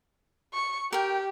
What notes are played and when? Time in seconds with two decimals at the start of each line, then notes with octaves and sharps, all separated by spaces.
0.54 C#6
0.93 G4 A#4 G5